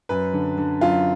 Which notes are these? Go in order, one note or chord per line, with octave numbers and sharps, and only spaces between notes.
F#2 B4
D3
D3
F#2 F4